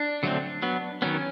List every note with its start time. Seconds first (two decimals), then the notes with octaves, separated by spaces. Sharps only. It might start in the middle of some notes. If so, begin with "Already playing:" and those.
Already playing: D4
0.23 D3 F#3 A3 C4
0.62 F#3 B3
1.02 D#3 F#3 B3 C#4